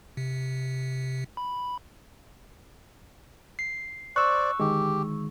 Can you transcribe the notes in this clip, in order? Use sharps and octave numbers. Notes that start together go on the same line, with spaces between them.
C3
B5
C7
C5 D5 C#6 E6 F#6
D3 D#3 G#3 G4